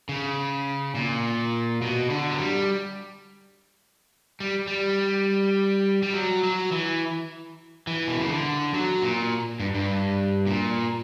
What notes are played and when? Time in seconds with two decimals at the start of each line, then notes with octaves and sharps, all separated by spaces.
0.09 C#3
0.95 A#2
1.82 B2
2.10 D3
2.31 F#3
2.39 G3
4.40 G3
4.67 G3
6.03 G3
6.14 F#3
6.43 F#3
6.72 E3
7.87 E3
8.07 B2
8.19 C#3
8.30 D3
8.74 F#3
9.02 A#2
9.60 G2
9.75 G2
10.47 A#2